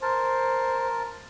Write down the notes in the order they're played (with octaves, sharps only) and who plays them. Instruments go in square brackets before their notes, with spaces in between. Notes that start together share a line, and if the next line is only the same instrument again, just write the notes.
[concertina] A#4 A5 [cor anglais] C5